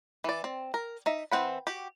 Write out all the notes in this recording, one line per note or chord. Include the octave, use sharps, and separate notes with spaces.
E3 D5
C4
A#4
D#4 E5
E3 C4 F#5 B5
F#4 G4